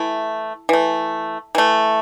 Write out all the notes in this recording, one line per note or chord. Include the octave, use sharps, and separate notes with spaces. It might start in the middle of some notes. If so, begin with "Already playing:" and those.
Already playing: E3 A3 E4
E3 A3
E3 A3